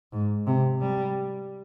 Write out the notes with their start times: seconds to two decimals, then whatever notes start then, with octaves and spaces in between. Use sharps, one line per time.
0.13 G#2
0.47 C3
0.82 G3